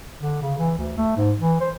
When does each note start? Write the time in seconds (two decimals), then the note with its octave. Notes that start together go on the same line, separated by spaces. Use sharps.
0.21 D3
0.42 C#3
0.58 E3
0.78 D2
0.97 A3
1.17 G#2
1.41 E3
1.61 C5